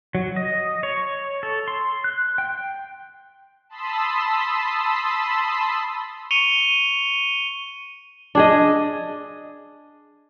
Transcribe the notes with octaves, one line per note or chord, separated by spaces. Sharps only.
F#3
D#5
C#5
A4
C6
F#6
G5
A5 B5 C6 D#6 E6 B6
C#6 C#7 D#7 F7 G7
D4 G#4 D#5